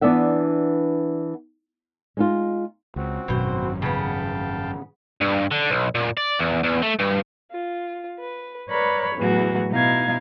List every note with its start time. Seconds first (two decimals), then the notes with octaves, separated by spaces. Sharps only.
0.01 E3 B3 D4 D5 E5 F#5
2.17 G#3 D#4 F4
2.96 C#2 C4 F#4
3.28 G#1 F#2 B2 C5
3.82 C#3 B3 F5 G5 A5
5.21 G2
5.51 D3
5.70 B1
5.95 A#2
6.17 D5
6.39 E2
6.64 E2
6.83 A3
7.00 G2
7.50 F4
8.20 B4
8.70 A#4 B4 C#5 D5 B5
9.16 E2 A2 E3 F#3 F#4
9.71 B2 D#4 E4 F5 G#6